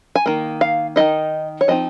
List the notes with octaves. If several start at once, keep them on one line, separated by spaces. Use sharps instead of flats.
G#5
D#3 A#3
F5
D#3 A#3 D#4 D#5
C#5
F3 C4 D#4 D#5